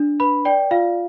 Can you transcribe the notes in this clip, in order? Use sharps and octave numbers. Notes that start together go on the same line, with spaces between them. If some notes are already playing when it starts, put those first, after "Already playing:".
Already playing: D4
B4 B5
D5 G5
F4 F5